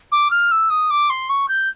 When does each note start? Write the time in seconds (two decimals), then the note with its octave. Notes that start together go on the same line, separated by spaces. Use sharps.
0.12 D6
0.30 F6
0.51 E6
0.70 D#6
0.90 D6
1.09 C6
1.29 C#6
1.48 G6